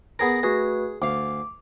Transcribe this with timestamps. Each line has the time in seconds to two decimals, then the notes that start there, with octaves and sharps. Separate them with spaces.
0.19 B3 G#4 A#4 A#6
0.43 A3 F#4 G#4 B4
1.02 D2 F5 D6